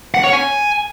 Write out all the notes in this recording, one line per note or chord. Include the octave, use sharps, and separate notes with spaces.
F#5
C#5
G#5